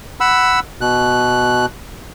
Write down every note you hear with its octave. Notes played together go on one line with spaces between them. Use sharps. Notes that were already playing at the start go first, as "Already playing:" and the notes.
F#5 B5 E6
B2 F#6